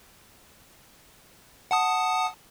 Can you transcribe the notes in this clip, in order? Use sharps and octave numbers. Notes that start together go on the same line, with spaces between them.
F#5 A5 D#6